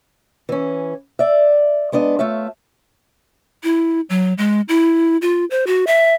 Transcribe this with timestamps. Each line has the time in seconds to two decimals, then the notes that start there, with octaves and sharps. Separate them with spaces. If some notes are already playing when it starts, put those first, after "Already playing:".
0.49 E3 C#4
1.19 D5 E5
1.92 G#3 B3 D4 D#5
2.19 A3 F4 C#5 E5
3.64 E4
4.10 F#3
4.38 G#3
4.69 E4
5.22 F4
5.51 C5
5.67 F#4
5.87 E5